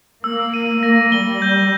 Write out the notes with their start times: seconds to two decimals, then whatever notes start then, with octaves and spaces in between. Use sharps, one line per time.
0.24 A#3 E6
0.54 D#7
0.83 A#3 A#6
1.12 G3 G7
1.42 G6